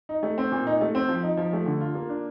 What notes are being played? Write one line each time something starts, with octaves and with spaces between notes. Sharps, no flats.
D#4
A3
C4
A#2
D#4
A3
C4
F3
D#4
F3
A3
D3
F4
A#3
D4